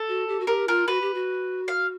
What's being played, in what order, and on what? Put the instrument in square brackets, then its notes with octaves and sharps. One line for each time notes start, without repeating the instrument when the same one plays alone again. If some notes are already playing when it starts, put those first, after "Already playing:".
Already playing: [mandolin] A4
[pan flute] F#4
G4
F#4
[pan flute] G4 [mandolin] A#4
[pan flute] F4 [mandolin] A#4
[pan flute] F#4 [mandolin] B4
[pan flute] G4
F#4
[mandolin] F5